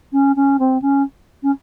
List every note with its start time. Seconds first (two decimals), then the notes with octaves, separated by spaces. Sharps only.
0.12 C#4
0.36 C#4
0.59 C4
0.82 C#4
1.43 C#4